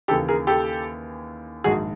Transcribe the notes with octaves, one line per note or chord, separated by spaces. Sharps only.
D#2 C#3 E3 G4 A4
G#4 A#4
G4 A4
A#1 G#2 D#3 F#4 G#4